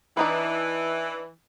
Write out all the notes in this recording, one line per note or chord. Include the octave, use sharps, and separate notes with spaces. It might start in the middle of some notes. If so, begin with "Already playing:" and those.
E3 D4 D#4 B4